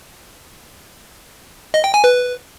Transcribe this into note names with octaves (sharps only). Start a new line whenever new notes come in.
D#5
G5
G#5
B4